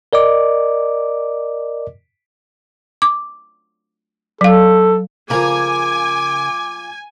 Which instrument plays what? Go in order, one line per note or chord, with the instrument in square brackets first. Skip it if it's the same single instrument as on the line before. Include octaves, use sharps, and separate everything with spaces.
[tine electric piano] A#4 D5 D#5 D6
[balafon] D6
[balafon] F#3 F5 [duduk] A4
[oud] C#3 A#4 [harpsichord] F3 A#3 [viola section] G#5 [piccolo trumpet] D6